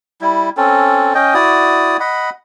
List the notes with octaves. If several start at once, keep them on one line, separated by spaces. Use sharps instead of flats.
G3 E4
C4 C#4 A4
C#4 D#5 G5
E4 F#4 D5 D#6
D#5 F#5 B5